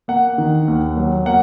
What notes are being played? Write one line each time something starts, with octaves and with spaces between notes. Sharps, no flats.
A#3 F#5
D#3
D#2
F#3
A#3 F#5